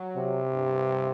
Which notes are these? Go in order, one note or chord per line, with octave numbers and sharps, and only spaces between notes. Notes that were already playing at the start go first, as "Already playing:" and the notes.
Already playing: F#3
C3
G2